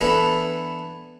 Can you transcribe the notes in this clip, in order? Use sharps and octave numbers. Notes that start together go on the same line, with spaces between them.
E3 B3 D4 E4 A4